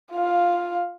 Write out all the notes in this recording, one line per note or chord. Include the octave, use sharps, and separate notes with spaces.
F4 F5